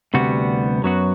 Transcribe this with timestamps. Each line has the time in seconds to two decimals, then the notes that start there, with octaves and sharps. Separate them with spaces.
0.14 D2 C3 G3 B3 F#4
0.83 F#2 F#3 B3 F#4